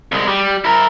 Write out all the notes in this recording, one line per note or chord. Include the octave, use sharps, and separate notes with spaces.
C2 G#3
G3
E4 A#4